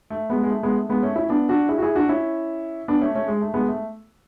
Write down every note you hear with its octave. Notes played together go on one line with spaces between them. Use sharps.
A3
G#3 B3
G#3
A3
G#3 B3
A3
G#3 B3
A3 C#4
C#4 E4
B3 D4
D4 F#4
E4 G#4
F#4
E4 G#4
D4 F#4
C#4 E4
B3 D4
A3 C#4
A3 C#4
G#3
A3
G#3 B3
A3